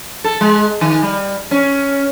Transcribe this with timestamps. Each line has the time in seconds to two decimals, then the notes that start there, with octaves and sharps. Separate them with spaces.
0.24 A4
0.41 G#3
0.81 D#3
1.03 G3
1.51 C#4